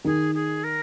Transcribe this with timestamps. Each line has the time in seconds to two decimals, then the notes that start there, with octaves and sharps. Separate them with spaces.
0.05 D#3 G#4
0.34 G#4
0.63 A#4